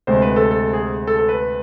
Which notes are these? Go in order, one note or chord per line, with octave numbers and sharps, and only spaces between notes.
D2 C3 G#3 C5
B4
A4
A4
G#4
A4
A4
B4